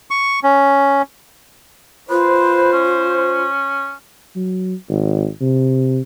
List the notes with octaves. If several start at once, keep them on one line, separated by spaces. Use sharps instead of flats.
C#6
C#4
F4 B4 C5
C#4
F#3
G#1
C3